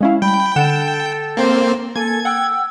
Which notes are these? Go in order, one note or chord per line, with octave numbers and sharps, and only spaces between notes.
G#3 C#4 E4 F5
G3 G5 B5
D3 A4 F#5 E7
A#3 C4 C5
A#3 A4 G#5 G#6
F#5 G5 E6